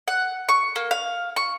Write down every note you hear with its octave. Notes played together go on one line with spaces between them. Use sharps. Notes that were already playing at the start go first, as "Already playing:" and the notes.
F#5
C#6
A#3
F5
C#6